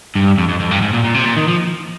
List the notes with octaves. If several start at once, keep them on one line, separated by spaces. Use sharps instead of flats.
G2
F2
F2
F2
G2
G#2
A#2
A#2
C3
A#2
D#3
F3